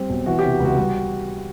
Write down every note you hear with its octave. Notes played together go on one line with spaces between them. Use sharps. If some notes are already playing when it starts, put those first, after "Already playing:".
Already playing: G3 C4
B1
E3 F#4
C3 G4
F#4
C#2
F#4
G3